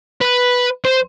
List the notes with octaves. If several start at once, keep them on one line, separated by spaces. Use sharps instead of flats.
B4
C5